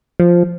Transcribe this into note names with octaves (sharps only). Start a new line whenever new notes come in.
F3